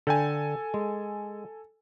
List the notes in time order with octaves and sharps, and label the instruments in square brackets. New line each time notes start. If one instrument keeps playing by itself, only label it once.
[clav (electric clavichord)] D3 G5 [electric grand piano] A4 G#5
[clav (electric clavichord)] G#3